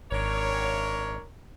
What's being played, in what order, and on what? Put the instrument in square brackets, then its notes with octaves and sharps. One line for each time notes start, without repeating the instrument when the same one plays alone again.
[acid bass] G#1 [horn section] D4 A#4 C#5